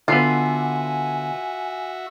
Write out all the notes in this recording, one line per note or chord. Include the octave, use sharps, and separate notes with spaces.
D3 B3 F4 F#4 E5 G#5